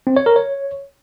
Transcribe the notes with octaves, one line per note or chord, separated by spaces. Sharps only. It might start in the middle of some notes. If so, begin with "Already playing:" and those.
C4
C#5
A#4
C#5